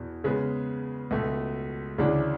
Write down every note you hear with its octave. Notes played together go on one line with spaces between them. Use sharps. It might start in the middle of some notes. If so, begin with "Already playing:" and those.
Already playing: E2 B2
C#3 G#3 B3
C#2 B2 A3
D2 C#3 E3 G#3 D4